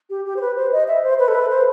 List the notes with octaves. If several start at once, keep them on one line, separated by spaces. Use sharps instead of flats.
G4
G4
C5
B4
C5
D#5
E5
C5
B4
A4
B4
C5